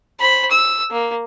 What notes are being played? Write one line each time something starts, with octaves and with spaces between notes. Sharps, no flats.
C5 B5
E6
A#3